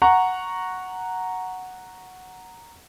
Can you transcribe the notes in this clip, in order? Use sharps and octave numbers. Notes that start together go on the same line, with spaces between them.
F#5 A#5 C#6